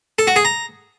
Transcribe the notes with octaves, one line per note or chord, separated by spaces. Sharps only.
A4
F#4
G#4
A#5